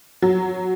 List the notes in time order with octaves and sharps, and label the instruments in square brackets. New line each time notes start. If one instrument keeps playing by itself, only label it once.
[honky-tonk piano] F#3